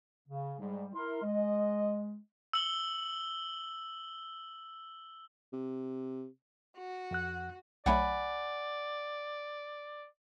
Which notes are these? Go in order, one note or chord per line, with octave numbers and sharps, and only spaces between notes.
C#3
G#2 G3
E4 A#4 C6
G#3 D#5
E6 F#7 G7
C3
F#4
F2 F#5 F#6
B1 F#3 A3 D5 F#5 G#5 B5